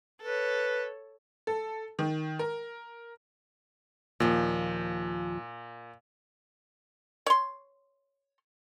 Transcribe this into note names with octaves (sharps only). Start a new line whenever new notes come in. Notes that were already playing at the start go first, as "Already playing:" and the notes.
A4 B4 C#5
A4
D#3
A#4
D#2 A#2 F3
C#5 C6